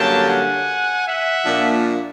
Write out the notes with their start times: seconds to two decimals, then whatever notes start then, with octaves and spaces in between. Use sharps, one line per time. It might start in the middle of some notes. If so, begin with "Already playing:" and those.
Already playing: G2 D3 F#3 A#3 C#4 G5 A5
0.28 F#5 G#5
1.07 E5 F#5
1.45 A#2 F3 A#3 D4